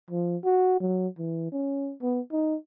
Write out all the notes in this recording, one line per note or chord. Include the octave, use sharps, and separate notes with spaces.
F3
F#4
F#3
E3
C#4
B3
D#4